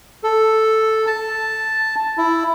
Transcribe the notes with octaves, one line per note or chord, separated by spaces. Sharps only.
A4
A5
E4